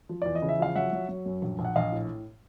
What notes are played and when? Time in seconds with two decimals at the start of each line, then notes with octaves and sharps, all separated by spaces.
0.09 F3
0.22 E2 D5
0.35 D#5
0.42 C#3
0.49 E5
0.59 F3 F5
0.75 F#3 E5 F#5
0.93 F#3
1.09 F#3
1.26 F#2
1.42 A#1
1.59 A#1
1.65 F#5
1.75 A#1 D#5 F5
1.92 A2